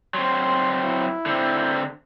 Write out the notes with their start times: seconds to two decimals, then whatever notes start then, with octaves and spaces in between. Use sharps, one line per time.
0.14 F#3 C4 C6
0.84 E4
1.26 D3 C4